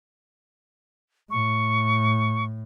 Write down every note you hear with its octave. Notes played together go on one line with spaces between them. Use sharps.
A2 C#6